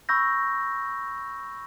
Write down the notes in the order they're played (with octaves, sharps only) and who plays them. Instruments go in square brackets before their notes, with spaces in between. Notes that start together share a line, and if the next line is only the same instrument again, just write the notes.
[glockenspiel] B5 C#6 E6 G6 A#6